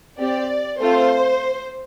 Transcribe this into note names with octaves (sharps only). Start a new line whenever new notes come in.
C4 G4 D5
A3 C4 F4 A4 C5